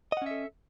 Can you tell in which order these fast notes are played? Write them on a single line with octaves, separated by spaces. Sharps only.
D#5 F#5 C#4 E5 A4